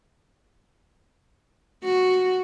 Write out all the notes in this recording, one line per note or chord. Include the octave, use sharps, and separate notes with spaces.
F#4